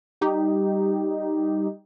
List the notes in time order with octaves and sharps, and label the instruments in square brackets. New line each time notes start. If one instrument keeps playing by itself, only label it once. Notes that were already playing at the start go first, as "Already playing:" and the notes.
[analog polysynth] G3 D#4 G4